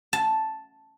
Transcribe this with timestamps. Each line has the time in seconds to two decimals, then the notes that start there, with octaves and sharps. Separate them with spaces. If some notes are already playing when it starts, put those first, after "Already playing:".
0.13 A5